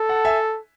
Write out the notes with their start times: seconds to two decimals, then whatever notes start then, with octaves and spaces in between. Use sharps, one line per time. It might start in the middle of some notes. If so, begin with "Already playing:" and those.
Already playing: A4
0.09 F#5 A5
0.25 E5 G#5